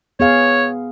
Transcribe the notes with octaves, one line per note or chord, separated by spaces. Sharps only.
B3 G#4 C#5 F5